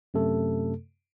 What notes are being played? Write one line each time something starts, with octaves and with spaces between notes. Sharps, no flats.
F#2 C3 A3 A4